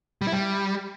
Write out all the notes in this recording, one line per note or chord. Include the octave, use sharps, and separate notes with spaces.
G3
E4
G3